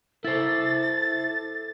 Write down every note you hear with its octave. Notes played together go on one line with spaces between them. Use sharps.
E4 A4 C5 A6